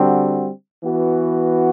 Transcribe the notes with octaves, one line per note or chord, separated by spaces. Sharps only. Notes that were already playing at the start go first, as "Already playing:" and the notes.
Already playing: D3 G3 C4 F#4
E3 B3 F#4